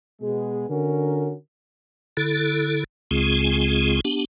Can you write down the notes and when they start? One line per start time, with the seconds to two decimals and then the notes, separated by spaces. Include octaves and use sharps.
0.21 B2 G#3 B3 G#4
0.69 D3 C#4 F#4 A#4
2.17 D3 E4 A4
3.11 C#2 C#3 G#3 C4 F4 G#4
4.05 B3 D4 G4